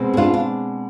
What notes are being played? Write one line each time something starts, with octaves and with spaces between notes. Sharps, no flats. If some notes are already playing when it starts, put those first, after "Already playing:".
Already playing: B2 G#3 C4
G#4
D4 F4
D4